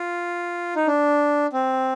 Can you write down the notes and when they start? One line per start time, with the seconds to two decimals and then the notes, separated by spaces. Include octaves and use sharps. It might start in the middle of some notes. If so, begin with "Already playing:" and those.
Already playing: F4
0.76 D#4
0.87 D4
1.53 C4